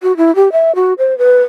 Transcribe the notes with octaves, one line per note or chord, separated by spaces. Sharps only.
F#4
E4
G4
E5
F#4
C5
B4